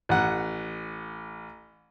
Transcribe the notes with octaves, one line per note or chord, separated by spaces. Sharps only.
A1 F#5